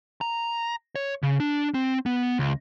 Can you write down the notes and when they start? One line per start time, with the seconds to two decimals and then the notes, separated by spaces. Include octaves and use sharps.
0.21 A#5
0.96 C#5
1.23 C#3
1.40 D4
1.74 C4
2.06 B3
2.39 C#2